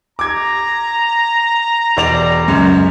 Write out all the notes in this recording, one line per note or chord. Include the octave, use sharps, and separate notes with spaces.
A#5 D6 G#6
E1 D5 F7
C#2 F#2